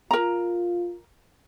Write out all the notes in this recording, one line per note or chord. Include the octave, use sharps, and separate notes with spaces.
F4 A#4 A#5